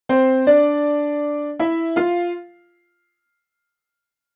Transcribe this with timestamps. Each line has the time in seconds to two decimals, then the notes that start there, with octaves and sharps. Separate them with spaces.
0.09 C4 C5
0.47 D4 D5
1.59 E4 E5
1.96 F4 F5